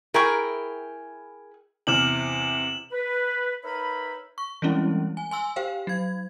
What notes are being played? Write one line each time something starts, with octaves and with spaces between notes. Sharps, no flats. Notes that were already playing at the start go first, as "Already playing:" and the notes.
E4 G#4 A#4 G5 C#6
E2 C3 F6 E7 F#7
B4
D#4 A#4 B4 C#5 E5 B5
C#6
E3 G3 G#3 C4 C#4 E4
G#5
G#5 C6 E6
G4 C5 F5 G5
F#3 G#6